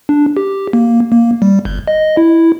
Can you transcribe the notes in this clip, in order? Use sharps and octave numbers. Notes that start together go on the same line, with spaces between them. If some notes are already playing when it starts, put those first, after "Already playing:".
D4
G4
A#3
A#3
G3
G1
D#5
E4